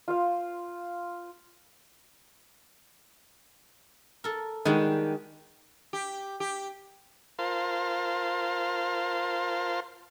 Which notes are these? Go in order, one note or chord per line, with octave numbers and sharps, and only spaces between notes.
F4 C5 F5
A4 A#4
D#3 G3 G#3 D4 F#4
G4
G4
F4 A#4 C5 F5 A5 C6